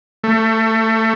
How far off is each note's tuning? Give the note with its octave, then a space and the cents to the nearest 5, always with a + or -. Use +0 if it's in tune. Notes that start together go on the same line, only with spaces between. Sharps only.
A3 +20